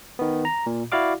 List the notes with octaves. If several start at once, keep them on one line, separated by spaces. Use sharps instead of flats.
D#3 B3
A#5
A#2
E4 F#4 D5 F5 D6